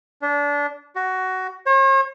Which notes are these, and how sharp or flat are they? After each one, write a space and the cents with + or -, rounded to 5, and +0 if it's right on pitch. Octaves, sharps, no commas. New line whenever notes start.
D4 -25
F#4 +15
C#5 -45